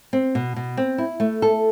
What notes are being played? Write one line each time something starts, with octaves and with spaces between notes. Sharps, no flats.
C4
B2
B2
C4
E4
A3
A4